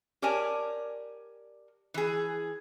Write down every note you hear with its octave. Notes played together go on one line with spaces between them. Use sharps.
G4 A#4 C#5 D5 G#5 A5
E3 G#4